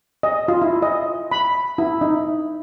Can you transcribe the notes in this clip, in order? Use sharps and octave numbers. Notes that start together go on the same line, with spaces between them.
D#5
F4
E4
D#5
B5
E4
D#4